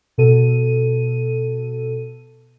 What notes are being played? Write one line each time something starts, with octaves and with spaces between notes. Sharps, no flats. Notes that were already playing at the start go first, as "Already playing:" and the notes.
B2 A4 D#7